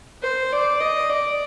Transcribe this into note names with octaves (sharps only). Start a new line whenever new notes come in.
C5
D5
D#5
D5